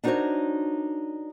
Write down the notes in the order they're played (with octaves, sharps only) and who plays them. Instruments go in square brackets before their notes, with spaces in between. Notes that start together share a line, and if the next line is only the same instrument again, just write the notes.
[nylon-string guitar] D4 D#4 F#4 A#4 C5 C#5